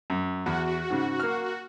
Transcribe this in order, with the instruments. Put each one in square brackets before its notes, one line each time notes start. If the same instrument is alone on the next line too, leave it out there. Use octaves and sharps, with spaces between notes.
[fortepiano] F#2
[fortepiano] E2 [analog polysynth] F#4
[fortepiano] G#2 C#3
A#3 F6